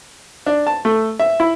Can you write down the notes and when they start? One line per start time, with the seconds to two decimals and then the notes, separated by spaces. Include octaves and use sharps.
0.46 D4
0.67 A5
0.85 A3
1.20 E5
1.40 E4